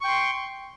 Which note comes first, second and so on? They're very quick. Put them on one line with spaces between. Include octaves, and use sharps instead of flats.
C#6 G5 C6